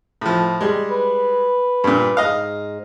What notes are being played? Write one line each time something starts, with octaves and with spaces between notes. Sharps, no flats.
A2 F3
G3 G#3
B4
G2 A#2
G#2 D#5 F5